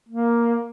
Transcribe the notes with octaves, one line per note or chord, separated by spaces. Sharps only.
A#3